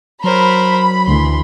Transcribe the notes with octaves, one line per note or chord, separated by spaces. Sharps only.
F#3 A#4 C5 B5
D2 E3 C6